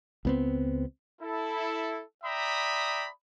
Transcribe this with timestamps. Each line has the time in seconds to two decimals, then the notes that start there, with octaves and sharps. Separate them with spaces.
0.25 C#2 B3 C4
1.22 E4 A4
2.24 D5 E5 G5 A#5 B5 D#6